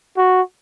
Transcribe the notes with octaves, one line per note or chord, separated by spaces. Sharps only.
F#4